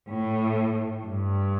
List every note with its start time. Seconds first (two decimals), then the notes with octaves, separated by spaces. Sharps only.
0.10 A2
1.04 G2